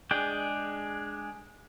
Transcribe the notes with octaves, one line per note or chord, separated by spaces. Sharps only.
G#3 D4 G#4 G5